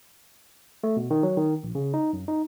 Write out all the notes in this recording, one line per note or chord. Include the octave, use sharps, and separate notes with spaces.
A3
B2
D#3
F#3
D#3
A#1
C#3
D#4
F#2
D#4